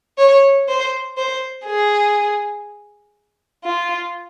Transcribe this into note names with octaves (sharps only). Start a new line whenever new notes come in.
C#5
C5
C5
G#4
F4